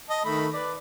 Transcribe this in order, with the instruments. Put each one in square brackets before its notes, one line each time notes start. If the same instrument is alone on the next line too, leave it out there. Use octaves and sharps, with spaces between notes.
[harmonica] D#5 A5
D#3 A3 B5
B4 D5